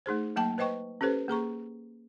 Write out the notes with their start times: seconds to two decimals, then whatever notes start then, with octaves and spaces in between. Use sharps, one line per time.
0.06 A3 D#4 G#4 C5
0.36 F#3 A#3 G5 A5
0.58 B4 C5 D#5 G5 C#6
1.01 C#4 G4 A4 B4 C5
1.28 A#3 G#4 A#5 C#6